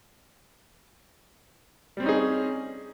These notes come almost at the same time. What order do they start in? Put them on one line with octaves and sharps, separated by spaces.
G3 C4 C#4 D#4 G#4